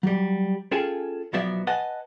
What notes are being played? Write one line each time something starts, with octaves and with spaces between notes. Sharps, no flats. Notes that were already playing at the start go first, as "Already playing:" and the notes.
F#3 G3
C#4 F4 G#4 A4 G5 G#5
B1 F3 F#3 B3 D5 E5
B4 D#5 F#5 G#5 A5